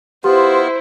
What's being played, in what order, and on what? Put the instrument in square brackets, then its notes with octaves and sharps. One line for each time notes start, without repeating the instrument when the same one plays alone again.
[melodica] B3 F4 [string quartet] E4 C5 [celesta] G4